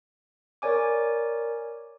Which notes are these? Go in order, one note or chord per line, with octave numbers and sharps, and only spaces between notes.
A#4 C#5 D5 G#5 D6